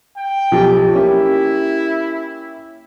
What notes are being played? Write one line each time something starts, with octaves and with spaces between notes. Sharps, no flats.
G5
B1 F3 G4
A#3 C#4 E4 G4